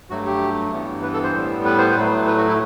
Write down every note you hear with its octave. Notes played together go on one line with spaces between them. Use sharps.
G2 F#3 A3 F#4
G4
G2 E3 B3
B4
A4
C5
A2 G3 B3
B4
C5
B4
A2 F#3 A3
B4
F#4
E4